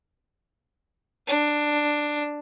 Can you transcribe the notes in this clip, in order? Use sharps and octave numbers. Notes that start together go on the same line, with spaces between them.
D4